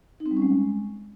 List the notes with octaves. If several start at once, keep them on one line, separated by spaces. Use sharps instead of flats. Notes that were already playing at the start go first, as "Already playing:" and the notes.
D#4
C4
G3
C#4
G#3